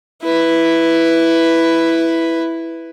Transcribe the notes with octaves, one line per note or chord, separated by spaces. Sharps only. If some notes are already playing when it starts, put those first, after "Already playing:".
E4 B4